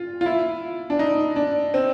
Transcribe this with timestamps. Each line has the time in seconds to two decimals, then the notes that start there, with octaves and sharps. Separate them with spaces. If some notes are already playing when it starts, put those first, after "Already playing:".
Already playing: F4
0.21 F4
0.26 E4
0.90 D4
0.99 D#4
1.36 D4
1.74 C4